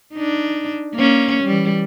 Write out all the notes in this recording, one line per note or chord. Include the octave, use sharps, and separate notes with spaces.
D4 D#4
A#3 C#4
E3 G3